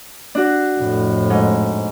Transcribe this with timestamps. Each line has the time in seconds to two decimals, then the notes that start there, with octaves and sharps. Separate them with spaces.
0.35 D4 F#4
0.78 F2 A2
1.30 G#2